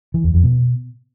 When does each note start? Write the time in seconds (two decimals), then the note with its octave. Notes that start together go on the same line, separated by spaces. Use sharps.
0.14 E3
0.24 E2
0.34 F2
0.44 B2